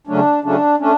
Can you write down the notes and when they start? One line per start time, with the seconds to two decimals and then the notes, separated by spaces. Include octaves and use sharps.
0.07 C#3 F#3 A3 C#4 D4
0.43 C#3 F#3 A3 C#4 D4
0.80 A3 C#4 D4